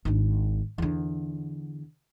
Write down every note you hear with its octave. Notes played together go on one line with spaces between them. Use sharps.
G#1 D4
E2 D3